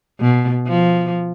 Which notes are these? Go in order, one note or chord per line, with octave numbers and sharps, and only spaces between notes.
B2
F3